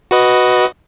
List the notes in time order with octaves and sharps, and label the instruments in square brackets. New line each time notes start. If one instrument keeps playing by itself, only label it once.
[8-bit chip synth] F#4 B4 D#5